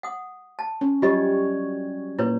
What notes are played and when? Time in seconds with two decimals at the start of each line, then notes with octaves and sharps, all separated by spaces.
0.03 F#5 D#6
0.59 A5
0.81 C#4
1.02 F#3 G3 F4 G4 C#5 D#5
2.19 A#2 E4 B4 C#5